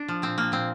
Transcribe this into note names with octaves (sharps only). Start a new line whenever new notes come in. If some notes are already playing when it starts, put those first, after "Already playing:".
Already playing: D4
F3
A#2 C4
F3 A#3
A#2 C4